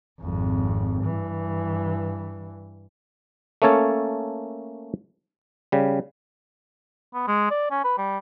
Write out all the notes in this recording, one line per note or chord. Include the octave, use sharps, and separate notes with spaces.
G#1 F2
G2 E3
A3 A#3 C#4 A4 C#5 A5
C#3 G3
B3
G#3
D5
C#4
B4
G3